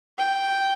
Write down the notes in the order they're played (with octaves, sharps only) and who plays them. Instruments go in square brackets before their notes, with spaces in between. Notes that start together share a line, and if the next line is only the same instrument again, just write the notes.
[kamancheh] G5